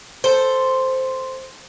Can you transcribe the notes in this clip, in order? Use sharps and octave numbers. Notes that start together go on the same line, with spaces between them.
A4 C5